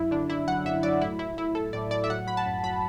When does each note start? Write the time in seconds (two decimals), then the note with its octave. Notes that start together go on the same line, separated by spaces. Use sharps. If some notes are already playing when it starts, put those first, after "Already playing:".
Already playing: F#2 E4
0.11 D3 D4
0.30 D3 E4
0.48 F#3 F#5
0.65 F#2 E5
0.83 F#3 D5
1.01 A2 E4
1.19 A2 E4
1.37 A2 E4
1.55 A2 A4
1.73 A2 D5
1.91 A2 D5
2.04 E5
2.10 F#3 F#5
2.27 F#3 B5
2.37 A5
2.46 F#2
2.63 F#3 B5